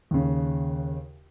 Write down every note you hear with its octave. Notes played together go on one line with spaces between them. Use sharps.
D#2 C#3